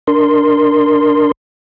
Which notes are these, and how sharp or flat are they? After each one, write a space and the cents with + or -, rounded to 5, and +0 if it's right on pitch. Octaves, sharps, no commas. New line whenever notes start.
D4 +0 A#4 +0 C6 +0